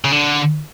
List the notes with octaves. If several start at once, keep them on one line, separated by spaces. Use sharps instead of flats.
C#3
D3